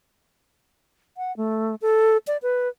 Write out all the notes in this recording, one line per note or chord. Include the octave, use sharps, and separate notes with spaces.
F#5
A3
A4
D5
B4